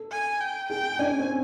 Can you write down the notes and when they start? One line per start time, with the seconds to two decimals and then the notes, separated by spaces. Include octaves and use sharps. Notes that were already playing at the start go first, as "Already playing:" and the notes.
Already playing: A4
0.12 G#5
0.41 G5
0.70 G#4 G5
0.99 D4 G#5
1.10 C#4
1.20 C4